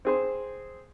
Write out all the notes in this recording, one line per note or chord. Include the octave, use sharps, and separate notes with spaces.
C4 G#4 C5